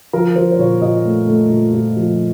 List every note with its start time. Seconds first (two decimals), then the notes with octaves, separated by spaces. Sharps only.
0.13 F3 A#4
0.36 F3 C5
0.52 C5
0.59 A#2 C#5
0.81 A#2 D#5
1.05 A3
1.27 A3
1.50 A#2
1.73 A#2
1.96 F3